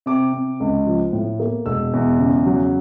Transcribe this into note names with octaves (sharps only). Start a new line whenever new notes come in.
C3 D6
C3
C#2
F3
A2
A#3
E1 E6
E2
C#3
F#3